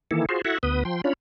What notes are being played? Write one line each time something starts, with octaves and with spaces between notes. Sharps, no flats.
D#3 E3 A#3 E4 A4
F4 F#4 G#4 C5
E4 F#4 A4 E5 F#5
D2 B3 B4 D#6
F3 G5 C6
C#4 D4 F4 C#5 B5